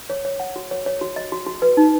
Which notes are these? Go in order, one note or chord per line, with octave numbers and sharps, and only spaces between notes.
C#5
C#5
F#5
F#4
C#5
C#5
F#4
D#5
F#4
F#4
B4
D#4